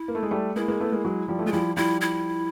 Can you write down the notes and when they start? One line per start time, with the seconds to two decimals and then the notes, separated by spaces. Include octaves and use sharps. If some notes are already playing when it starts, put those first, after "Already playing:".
Already playing: E4
0.08 A#3
0.15 A3
0.23 G#3
0.31 G3 A3
0.56 G#3 A#3 E4
0.68 G#3 A#3
0.80 A3 B3
0.92 G#3 A#3
1.05 F#3 G#3
1.28 F3 G3
1.39 A3
1.46 G#3 F4
1.52 F3 G3 E4
1.77 F3 G3 E4
2.01 E4